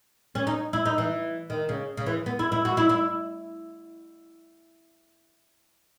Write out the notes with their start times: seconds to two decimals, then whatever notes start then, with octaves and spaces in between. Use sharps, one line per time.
0.35 C#4
0.47 D#4
0.73 E4
0.85 D#4
0.98 E3
1.50 D#3
1.69 C#3
1.97 C#3
2.06 E3
2.26 B3
2.39 E4
2.52 E4
2.65 F#4
2.77 E4
2.89 E4